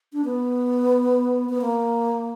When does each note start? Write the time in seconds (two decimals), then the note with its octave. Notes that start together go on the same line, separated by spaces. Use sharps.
0.13 D4
0.25 B3
1.49 B3
1.62 A#3